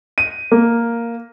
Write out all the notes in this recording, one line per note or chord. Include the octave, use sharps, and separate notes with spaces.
D#7
A#3